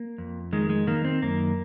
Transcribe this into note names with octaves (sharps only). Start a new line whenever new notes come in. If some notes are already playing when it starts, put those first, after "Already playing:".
Already playing: A#3
F2
D#3 G#3
G#3
D#3 A#3
C4
F#2 A#3